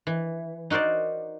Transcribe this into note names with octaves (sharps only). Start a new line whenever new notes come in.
E3
D#4 F#4 A#4 C5 D5